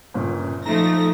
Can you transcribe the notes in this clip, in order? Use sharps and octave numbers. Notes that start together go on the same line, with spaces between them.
G1 A#2 C#3
F3 A3 D#4 A#5 A#6